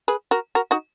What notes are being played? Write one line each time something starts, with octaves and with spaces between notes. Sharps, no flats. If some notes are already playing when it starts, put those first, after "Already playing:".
G#4 B4
F#4 A#4
F#4 A#4
D#4 F#4